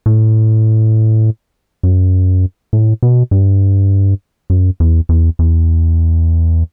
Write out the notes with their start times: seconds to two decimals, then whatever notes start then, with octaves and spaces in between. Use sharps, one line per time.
0.06 A2
1.83 F#2
2.73 A2
3.03 B2
3.31 G2
4.50 F#2
4.80 E2
5.09 E2
5.39 E2